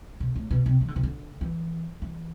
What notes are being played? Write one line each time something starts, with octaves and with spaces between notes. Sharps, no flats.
B2
A2
B2
C3
E3
D3
C3
D3
E3
E3